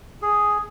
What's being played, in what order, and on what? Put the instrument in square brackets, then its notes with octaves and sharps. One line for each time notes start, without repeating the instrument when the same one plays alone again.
[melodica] G#4